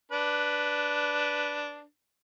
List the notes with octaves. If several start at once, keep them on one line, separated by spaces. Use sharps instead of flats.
D4 B4